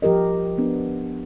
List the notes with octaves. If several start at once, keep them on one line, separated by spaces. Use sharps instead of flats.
F3 G4 A#4 D#5
B3 D4